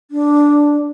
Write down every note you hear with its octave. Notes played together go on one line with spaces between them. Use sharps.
D4